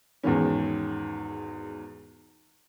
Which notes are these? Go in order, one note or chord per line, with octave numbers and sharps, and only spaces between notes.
E2 G#2 B2 D#3 C#4